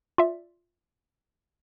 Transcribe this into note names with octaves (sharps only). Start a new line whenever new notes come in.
F4 D5 E5